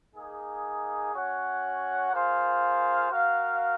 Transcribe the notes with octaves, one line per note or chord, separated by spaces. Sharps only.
A#3 D#4 G#4
C#4 F#4 C#5 F#5
A#3 F4 G#4 C5 F5
F#4 A#4 F5